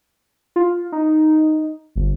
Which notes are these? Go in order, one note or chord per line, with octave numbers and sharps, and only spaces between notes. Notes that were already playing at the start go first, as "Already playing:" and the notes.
F4
D#4
G1